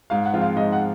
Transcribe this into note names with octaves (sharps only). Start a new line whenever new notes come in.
G#2 F5
F#5
F3 G#3 C4 F4
F5
G#2 D#5
F#5